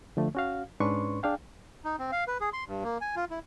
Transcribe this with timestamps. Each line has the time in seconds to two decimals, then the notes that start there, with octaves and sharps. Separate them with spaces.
0.17 D3 F3 A3
0.35 C#4 F#4 F5
0.80 G#2 C#4 D4 B4 C6 C#6
1.23 D4 G#4 F5 G5
1.85 D#4
1.99 C4
2.12 F5
2.27 B4
2.41 G#4
2.53 C6
2.67 G2
2.84 A#3
3.01 G#5
3.16 F4
3.30 E4